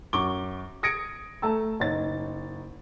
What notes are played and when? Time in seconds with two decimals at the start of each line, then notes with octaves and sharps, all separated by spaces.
0.13 F#2 C#6 D6 G7
0.83 D#6 G#6 A#6 C#7 D7
1.42 A3 A4 A5 A#5 E6
1.80 F#1 D#4 C#5 A6